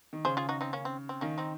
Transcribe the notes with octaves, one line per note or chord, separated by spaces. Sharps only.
D#3
C#3 G#4 C5
F4 G#4
D#4 F#4
C4 D#4
A#3 C#4
C4
C4
D#3 A#3 C#4
C4 D#4